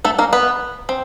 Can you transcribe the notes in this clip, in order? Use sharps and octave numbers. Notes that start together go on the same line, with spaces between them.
A3 A4
A#3 A#4
B3 B4
C4